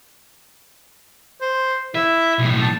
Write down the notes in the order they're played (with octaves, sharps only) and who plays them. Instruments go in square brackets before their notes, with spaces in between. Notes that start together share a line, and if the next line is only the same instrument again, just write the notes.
[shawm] C5
[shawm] E4 [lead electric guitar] E5
[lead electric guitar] B1 A2
[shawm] A5